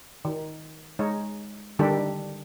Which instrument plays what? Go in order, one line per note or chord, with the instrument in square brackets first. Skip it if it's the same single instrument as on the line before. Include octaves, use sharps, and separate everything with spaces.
[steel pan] D#3
G#3 D#4 C#5
D3 D#3 G3 D4 G4 A4